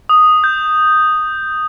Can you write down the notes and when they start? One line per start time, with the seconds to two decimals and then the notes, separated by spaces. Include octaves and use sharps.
0.09 D#6
0.44 G6